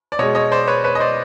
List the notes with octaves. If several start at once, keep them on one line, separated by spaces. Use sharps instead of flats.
D5
B2 G#3 C#5 D#5
C#5 D#5
C5 D5
B4 C#5
B4 C#5
D#5
C5 D5